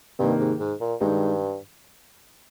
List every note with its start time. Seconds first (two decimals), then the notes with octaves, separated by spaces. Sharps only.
0.19 G2 C3 D#3 A#3 D#4
0.39 G#2
0.60 G#2
0.81 A#2
1.00 G2 D#3 G#3 D#4